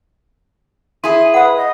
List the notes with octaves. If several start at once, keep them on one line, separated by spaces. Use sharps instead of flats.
E4 G#4 C6 D#7
B4 F#5 B5 D#6
D#5